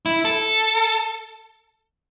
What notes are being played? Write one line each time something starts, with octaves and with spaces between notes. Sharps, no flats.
E4
A4